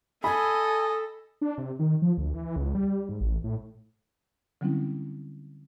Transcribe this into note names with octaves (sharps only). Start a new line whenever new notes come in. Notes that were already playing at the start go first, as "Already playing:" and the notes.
A4 D#5 G#5 B5
D4
C3
D#3
F3
D2
E3
C#2
G3
G#2
A1
A2
D3 F#3 G3 C4 C#4 E4